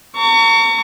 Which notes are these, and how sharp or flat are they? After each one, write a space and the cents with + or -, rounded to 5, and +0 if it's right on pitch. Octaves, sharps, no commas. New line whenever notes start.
A#5 -40 C#6 +25